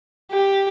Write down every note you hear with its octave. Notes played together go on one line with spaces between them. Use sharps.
G4